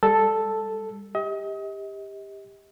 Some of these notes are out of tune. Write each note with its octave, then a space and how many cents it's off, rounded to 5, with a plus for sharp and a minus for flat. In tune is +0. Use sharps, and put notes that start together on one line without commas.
G3 +30 A4 +0
G4 +20 D#5 +35